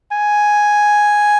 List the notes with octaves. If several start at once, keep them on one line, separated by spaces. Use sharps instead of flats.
G#5